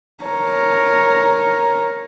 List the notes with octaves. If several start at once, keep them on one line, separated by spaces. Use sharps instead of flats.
A#4 C#5